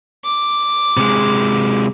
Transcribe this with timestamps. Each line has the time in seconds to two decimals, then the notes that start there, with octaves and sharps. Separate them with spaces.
0.24 D6
0.97 C3 G#3